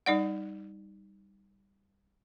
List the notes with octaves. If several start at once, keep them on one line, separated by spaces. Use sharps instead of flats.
G3 D#4 D5 F#5